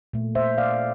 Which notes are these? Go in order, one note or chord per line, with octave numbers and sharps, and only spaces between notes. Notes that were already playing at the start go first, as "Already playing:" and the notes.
A#2 A3
C5 E5
D5 F5